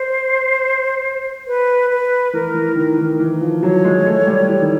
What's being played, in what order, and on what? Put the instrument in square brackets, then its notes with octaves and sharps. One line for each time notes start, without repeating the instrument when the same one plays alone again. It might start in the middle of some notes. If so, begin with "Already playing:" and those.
Already playing: [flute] C5
B4
B4
[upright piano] E3 [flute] A#4
[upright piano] E3
[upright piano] D#3 [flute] A#4
[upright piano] D#3
E3
F3
[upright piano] F#3 [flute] C#5
[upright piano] G#3
A3
G3
E3
D#3